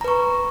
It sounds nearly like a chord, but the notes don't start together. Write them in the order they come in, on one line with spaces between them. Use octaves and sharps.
A#5 B4 C#6